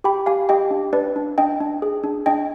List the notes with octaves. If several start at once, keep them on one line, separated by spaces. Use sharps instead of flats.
G4 G5 B5
G4 F5 G#5
G4 D#5 G5
D4
D4 B4 D5
D4
D4 D#5 G5
D4
G#4
D4
D4 D#5 G5